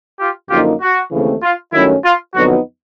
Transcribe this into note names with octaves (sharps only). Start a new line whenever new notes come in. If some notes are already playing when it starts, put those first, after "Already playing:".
F4 G4
F#2 D3 F3 A#3 D#4 F4 G4
F#4
D#2 C#3 E3 A3 C4
F4
G2 D#3 F#3 A3 C#4 E4
F4
F2 D3 F#3 B3 D#4 F#4